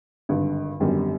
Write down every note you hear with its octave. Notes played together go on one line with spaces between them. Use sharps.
G#1 G2 D3
G#1 F#2 D3 G3 B3